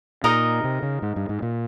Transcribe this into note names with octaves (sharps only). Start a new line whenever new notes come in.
A#2 D#4 A#4 D#5
C3
C#3
G#2
G2
G#2
A#2